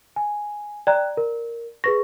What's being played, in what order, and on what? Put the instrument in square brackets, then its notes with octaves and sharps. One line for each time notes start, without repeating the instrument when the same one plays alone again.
[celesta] G#5
[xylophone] D5 A#5 [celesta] G5 F#6
[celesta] A#4
[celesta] G#4 B4 C#6 [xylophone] A#6